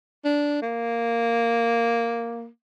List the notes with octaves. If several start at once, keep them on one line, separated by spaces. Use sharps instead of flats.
D4
A#3